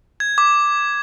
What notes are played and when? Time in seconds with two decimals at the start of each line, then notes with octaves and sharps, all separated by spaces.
0.20 G#6
0.38 D6